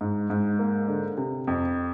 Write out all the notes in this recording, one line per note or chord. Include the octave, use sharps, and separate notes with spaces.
G#2
G#2
A#3
D3
C3
F2